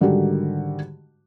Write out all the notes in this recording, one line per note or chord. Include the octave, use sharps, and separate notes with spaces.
G#2 D3 D#3 G3 F#4 G4